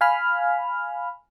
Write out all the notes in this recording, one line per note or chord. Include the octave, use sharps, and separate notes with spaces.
F5 G#5 B5 F6